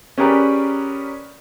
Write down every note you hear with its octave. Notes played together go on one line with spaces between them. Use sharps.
C#4 G4 G#4 A#4 B4 D5